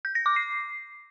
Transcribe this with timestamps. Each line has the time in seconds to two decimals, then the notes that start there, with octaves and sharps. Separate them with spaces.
0.05 G6
0.15 A#6
0.26 D6
0.36 C7